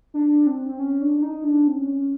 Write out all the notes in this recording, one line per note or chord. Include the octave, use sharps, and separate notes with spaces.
D4
C4
C4
C#4
D4
D4
D#4
D4
C4
C#4